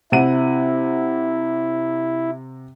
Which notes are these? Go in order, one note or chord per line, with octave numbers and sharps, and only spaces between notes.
C3 E4 F#5 D#7